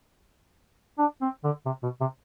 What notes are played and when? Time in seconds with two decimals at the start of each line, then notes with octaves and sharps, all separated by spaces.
0.99 D4
1.21 C4
1.44 D3
1.66 C3
1.83 B2
2.01 C3